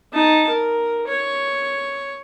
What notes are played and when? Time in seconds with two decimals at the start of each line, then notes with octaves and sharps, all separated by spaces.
0.13 D#4 A5
0.49 A#4
1.07 C#5